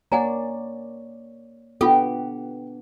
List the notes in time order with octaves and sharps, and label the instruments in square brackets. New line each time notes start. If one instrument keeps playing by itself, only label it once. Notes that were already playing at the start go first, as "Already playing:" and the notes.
[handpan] A#3 C#5 D5 [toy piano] F#5 G#5 A#5
[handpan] B3 D4 F#5 [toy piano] F4 A4 [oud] G4